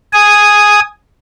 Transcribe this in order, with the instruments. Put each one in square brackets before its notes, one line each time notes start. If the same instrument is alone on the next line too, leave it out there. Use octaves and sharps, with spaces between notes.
[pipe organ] G#5 D#6